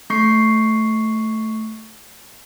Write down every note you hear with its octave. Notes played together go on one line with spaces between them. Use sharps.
A3 C#6 C7